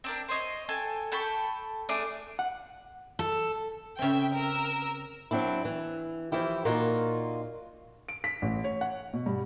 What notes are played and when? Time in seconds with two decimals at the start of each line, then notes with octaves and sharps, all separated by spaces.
0.04 C4 D4 A#4
0.29 C5 C#5 D#5
0.69 A4 G5 G#5
1.12 A4 G5 B5 C#6
1.89 A3 D4 G#4 D6
2.39 F#5
3.19 A4
3.99 C#3 C4 E5 G5
4.34 A#4 E6
5.31 F#3 C4 D4 E4
5.65 E3
6.32 E3 F3 E4 G4
6.65 A#2 A#3 D#4 F4 F#4
8.09 D7
8.24 B6
8.42 A1
8.64 C#5
8.81 F#5
9.14 B2
9.26 G2